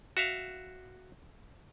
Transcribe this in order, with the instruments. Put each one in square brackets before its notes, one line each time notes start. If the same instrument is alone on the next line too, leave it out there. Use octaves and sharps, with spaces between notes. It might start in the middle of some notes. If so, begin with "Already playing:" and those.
[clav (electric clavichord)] F#4 E5 F5